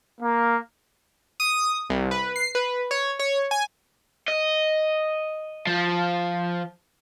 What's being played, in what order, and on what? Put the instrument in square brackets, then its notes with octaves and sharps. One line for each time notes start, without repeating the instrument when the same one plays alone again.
[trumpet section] A#3
[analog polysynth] D#6
C2
B4
C7
B4
C#5
C#5
G#5
[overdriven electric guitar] D#5
F3